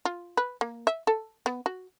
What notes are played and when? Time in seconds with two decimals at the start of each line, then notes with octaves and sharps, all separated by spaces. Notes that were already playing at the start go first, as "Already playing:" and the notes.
0.05 F4
0.37 B4
0.61 A#3
0.87 E5
1.07 A4
1.46 B3
1.66 F#4